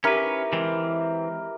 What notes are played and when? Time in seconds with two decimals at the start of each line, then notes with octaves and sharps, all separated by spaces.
0.04 C#4 E4 G4 A#4 B4
0.53 E3 G#3 C4